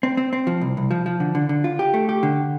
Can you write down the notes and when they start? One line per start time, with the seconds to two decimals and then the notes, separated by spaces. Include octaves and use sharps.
0.03 C4
0.17 C4
0.33 C4
0.47 F3
0.61 C2
0.77 C2
0.91 F3
1.06 F3
1.20 D3
1.35 D3
1.49 D3
1.64 F4
1.79 G4
1.94 A3
2.09 G4
2.23 D3